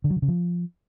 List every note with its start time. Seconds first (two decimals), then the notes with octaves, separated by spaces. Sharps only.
0.04 D3
0.10 F#3
0.16 D3
0.22 C#3
0.28 F3